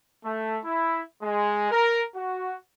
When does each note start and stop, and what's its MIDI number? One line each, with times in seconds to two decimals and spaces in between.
0.23 0.57 57
0.64 0.99 64
1.21 1.69 56
1.71 2.02 70
2.15 2.54 66